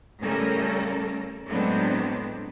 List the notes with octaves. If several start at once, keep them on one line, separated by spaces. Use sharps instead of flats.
A2 C#3 G3 C#4 A4 A#4
A2 F#3 G#3 B3 C4 D4